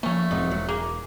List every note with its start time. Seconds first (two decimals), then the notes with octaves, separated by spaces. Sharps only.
0.03 F3 A3 A#3 C#4
0.31 E1 F2 G#2 D#4
0.51 F#3
0.69 A#3 G#4